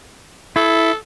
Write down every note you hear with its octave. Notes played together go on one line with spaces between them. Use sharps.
E4 A4